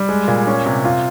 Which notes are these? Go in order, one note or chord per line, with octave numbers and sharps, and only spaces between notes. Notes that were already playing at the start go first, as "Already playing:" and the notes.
Already playing: G3
G#3
A#2
C#4
C3
F4